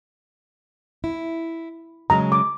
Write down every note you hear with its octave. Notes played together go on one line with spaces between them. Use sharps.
E4
C#3 F#3 G#3 A#5
D6